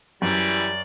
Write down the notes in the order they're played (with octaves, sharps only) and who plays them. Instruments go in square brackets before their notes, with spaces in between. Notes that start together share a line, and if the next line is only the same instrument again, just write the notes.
[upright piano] F#2 [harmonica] E3 G3 [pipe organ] D5